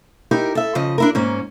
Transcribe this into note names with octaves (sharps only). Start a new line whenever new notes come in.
D#4 E4 G4 A#4
A4 E5
C#3 F3 D#5
D4 E4 A#4
G#2 A#3 C#4